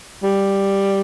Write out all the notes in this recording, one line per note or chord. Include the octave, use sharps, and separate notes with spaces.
G3